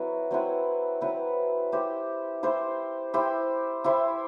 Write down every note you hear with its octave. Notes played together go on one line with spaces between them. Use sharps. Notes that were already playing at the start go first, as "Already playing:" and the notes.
Already playing: F#3 C4 E4 B4
F#3 C4 E4 B4
F#3 C4 E4 B4
E4 G4 C5
E4 G4 C5
E4 G4 C5
E4 G4 C5